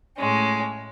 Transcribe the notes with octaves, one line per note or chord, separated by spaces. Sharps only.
A2 G#3 C#4